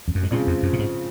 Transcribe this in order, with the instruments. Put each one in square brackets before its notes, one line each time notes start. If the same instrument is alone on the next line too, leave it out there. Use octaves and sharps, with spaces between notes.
[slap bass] F2
F#2
G#2
[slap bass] A#2 [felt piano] C#3 F3 G#3 C4
[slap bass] F2
F#2
A#2
G#2